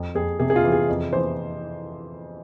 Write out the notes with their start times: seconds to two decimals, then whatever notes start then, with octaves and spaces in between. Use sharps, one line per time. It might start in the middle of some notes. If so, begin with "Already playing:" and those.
Already playing: F2
0.15 F2 G#4
0.39 C3 G#4
0.50 G#4
0.56 F4
0.64 E3
0.72 G#4
0.89 F2
1.13 E3 C5